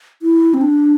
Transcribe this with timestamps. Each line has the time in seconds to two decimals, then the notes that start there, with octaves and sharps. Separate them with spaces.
0.22 E4
0.54 C4
0.61 D4